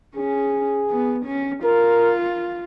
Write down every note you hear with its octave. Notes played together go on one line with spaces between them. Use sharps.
C#4 G#4
B3
C#4
F4 A#4